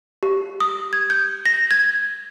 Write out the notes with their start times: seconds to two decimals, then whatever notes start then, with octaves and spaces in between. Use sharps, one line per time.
0.23 G4
0.60 D#6
0.93 G#6
1.10 G6
1.46 A#6
1.71 G#6